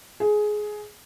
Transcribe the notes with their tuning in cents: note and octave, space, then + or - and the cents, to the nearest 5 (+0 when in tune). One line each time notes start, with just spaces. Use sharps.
G#4 +15